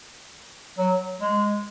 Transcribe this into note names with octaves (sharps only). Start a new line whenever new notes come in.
F#3
G#3